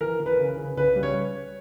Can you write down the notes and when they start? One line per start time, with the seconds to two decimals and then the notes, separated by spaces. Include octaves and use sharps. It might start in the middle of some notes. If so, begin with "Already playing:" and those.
0.01 E3 A#4
0.20 E3
0.26 B4
0.39 C#3
0.57 C#3
0.77 C#3 B4
0.96 G3
1.03 C#5